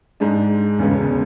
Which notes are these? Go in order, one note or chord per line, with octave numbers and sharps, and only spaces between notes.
G#2 G#3 D4
E1 D2 C#3 G#3 B3